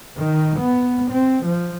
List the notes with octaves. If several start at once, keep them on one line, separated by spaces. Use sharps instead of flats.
D#3
B3
C4
F3